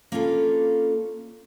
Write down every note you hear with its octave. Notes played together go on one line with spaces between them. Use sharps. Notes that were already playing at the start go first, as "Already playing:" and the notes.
A#3 C#4 D4 F4 A4 B4